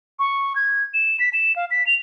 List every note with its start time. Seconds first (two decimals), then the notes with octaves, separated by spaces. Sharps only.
0.19 C#6
0.56 G#6
0.94 E7
1.20 B6
1.33 E7
1.56 F5
1.71 B6
1.87 F7